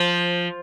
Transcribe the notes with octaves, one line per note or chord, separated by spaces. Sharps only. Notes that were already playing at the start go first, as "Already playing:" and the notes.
Already playing: F3